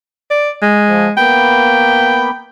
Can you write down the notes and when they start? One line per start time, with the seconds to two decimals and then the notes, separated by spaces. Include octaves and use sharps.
0.30 D5
0.62 G#3
0.87 F3
1.17 A#3 B3 G5 B5